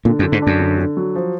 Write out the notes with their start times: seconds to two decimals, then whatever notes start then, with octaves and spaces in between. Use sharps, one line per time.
0.05 A#2 D3
0.19 F#2
0.24 D3
0.32 G#2
0.42 F#2 D4
0.60 D3
0.78 D3
0.97 F#3
1.15 F3